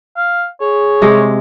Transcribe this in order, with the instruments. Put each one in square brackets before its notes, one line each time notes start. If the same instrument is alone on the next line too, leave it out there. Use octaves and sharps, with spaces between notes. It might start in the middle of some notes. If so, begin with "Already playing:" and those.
[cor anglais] F5
[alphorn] G#4 [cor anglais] C#5
[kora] C3 G#3